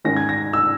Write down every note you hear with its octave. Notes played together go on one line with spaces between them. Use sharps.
G#2 D#3 G#3 C#4 A#6
G#6
A#6
E6